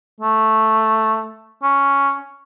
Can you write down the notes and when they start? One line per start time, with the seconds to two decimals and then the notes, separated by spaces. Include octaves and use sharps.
0.21 A3
1.63 C#4